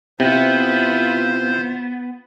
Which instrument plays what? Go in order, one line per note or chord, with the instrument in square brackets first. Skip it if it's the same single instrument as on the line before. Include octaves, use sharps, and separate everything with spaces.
[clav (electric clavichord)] C3 [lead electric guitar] B3 [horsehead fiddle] E4 F4 [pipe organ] C5